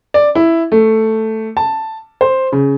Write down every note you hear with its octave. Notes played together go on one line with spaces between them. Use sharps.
D5
E4
A3
A5
C5
C#3